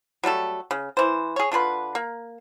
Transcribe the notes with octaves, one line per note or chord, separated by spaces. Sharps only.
F#3 G3 A3 A4
C#3
E3 C5
G#4 C#5
D3 F4 G#4 B4
A#3